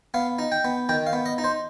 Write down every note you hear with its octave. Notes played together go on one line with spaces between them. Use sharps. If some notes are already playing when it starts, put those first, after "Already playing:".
B3 F5
D#4
G5
B3
D#3 G5
F5
B3
D#5
D#4
C5